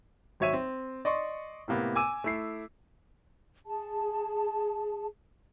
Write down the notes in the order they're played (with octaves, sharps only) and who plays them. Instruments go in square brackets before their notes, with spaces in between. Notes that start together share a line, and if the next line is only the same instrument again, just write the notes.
[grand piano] G#1 F#3 C#5 E5 D#7
C4
D5 D#5 C6 C#6
A2 C3 A#3 B3
G#5 D6 E6 D#7
A3 E4 C7
[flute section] G#4 A5